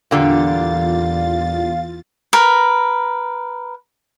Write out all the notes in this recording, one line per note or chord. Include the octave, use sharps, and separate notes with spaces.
E2 A#2 D3 G3 F4 F5 A6
A#4 B4